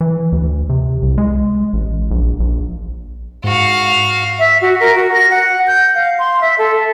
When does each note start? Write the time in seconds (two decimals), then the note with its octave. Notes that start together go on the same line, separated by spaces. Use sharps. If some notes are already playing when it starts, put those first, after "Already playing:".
0.01 E3
0.32 D2
0.69 C3
1.02 C2
1.18 G#3
1.73 A1
2.11 A#1
2.40 A#1
3.44 G#2 F#4 F5 C#7
4.39 E5
4.62 F#4
4.80 A#4
4.96 F#4
5.12 A#6
5.30 F#5
5.67 G6
5.95 F5
6.19 C6
6.41 E5
6.58 A4